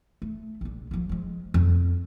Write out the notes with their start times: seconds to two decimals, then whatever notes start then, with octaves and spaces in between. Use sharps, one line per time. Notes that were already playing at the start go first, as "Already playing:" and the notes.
0.22 A3
0.61 A#1 D3
0.91 D3 F3
1.09 F3 G#3
1.54 F2